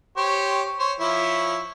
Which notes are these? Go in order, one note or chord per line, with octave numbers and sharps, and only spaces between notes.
G4 C5 C#5
C5 C#5
F3 E4 C#5